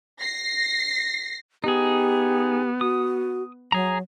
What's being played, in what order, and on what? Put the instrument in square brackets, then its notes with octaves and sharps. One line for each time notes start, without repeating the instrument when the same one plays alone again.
[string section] A#6 C7
[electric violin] B3 [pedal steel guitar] D#4 G#4 [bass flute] G4
[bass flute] F#4 [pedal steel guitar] D#6
[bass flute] F#3 [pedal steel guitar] G#4 A#5